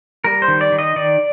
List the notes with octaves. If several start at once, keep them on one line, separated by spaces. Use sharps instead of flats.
G3 A#4
C5
D#3
D5
D#3
D#5
D#3 D5